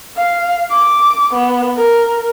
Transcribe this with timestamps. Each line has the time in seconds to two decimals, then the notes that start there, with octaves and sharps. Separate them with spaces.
0.17 F5
0.71 D6
1.33 B3
1.76 A#4